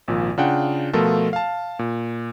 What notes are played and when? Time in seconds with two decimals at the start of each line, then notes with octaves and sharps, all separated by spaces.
0.08 G#1 A#2 F3
0.38 C#3 D4 F4 F#5 G5
0.93 B2 F3 A3 F4 A4 A#4
1.33 F5 A5
1.79 A#2